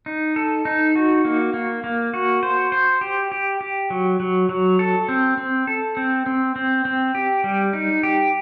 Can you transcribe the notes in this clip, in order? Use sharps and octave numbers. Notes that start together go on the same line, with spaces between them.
D#4
A4
D#4
F#4
A#3
A#3
A#3
F#4
C5
C5
G4
G4
G4
F#3
F#3
F#3
A4
C4
C4
A4
C4
C4
C4
C4
G4
G3
D#4
G4